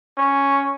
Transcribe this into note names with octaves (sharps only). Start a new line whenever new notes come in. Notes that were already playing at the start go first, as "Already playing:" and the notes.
C#4